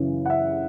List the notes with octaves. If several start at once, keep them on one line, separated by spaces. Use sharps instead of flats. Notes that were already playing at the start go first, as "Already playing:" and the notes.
Already playing: F#2 C#3 E3
F#5
E5